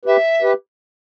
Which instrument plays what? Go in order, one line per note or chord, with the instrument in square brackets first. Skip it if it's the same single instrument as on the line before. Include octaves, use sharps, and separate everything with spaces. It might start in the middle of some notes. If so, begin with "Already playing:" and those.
[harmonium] G4 B4 [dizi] E5
[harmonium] G4 B4